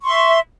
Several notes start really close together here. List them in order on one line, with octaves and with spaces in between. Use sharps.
C#6 C6 E5